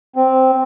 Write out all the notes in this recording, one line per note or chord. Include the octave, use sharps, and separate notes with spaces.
C4